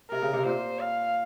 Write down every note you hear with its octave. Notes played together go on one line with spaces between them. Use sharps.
C3 A#4
C#3
C3
A#2 C5
F5